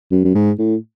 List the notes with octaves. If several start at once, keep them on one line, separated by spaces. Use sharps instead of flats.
F#2
F#2
G#2
A2